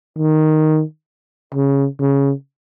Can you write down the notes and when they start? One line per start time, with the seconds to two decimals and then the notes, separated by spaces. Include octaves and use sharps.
0.18 D#3
1.55 C#3
2.00 C#3